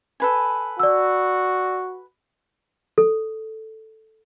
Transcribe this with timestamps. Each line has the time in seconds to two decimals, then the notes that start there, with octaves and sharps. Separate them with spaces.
0.20 A4 B4 G#5
0.80 F#4 D5 E6
2.98 A4